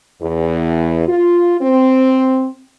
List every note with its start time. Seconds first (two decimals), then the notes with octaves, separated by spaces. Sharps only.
0.21 E2
1.07 F4
1.61 C4